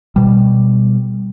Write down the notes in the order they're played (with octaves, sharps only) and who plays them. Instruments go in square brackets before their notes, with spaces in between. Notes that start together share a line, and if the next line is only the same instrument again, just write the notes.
[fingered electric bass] B2 G3